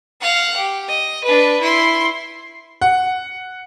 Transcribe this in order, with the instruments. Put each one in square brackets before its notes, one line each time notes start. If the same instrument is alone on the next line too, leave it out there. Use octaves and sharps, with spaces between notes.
[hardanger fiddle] F5 F#5
G4
D#5
D4 B4
E4 C6
[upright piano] F#5